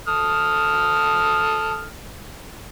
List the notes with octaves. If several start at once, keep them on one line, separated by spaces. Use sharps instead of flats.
A4 D#6 F6